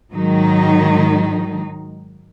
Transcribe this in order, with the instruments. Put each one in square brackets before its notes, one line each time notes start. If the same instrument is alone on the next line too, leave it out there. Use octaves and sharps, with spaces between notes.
[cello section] G#2 D#3 F#3 D#4